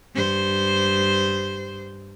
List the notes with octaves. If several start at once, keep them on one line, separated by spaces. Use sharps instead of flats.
G2 C5